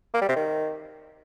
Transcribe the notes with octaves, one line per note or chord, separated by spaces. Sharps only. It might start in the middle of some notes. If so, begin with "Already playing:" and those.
A#3
G3
C3
D#3